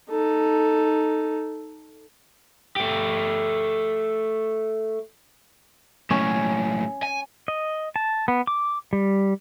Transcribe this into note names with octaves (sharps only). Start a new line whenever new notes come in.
D#4 A4
A3 G4
B1 A2 C#4
G#5
D#5
A5
B3
D6
G3